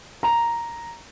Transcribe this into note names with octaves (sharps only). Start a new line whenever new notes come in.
A#5